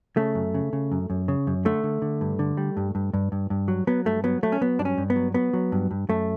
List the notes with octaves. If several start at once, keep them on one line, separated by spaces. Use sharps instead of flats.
C#3 A3
F#2
C#3
C#3
F#2
F#2
C#3
F#2
D3 A3
D3
D3
G2
D3
G3
G2
G2
G2
G2
G2
F#3
F#3 B3
G2 A3
F#3 B3
F#3 A3
C#4
F#3 B3
G2 D4
C#4
G2
B3
F#3
F#3 B3
F#3
G2
G2
F#2 A3